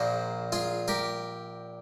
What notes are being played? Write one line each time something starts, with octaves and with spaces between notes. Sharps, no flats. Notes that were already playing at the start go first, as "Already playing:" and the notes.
Already playing: A#1 A#2 F3 G#4 C5
F4 G#4
G4 A#4